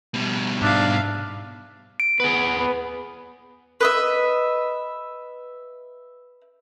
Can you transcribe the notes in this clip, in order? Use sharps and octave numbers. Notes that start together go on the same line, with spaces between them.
B2 G3
G#2 D4 E5 F5
D7
B3 G#4 B4
B3
B4 D#5 E5